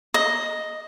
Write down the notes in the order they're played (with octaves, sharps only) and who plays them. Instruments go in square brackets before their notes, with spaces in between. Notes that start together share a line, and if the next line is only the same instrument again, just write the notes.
[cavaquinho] D#5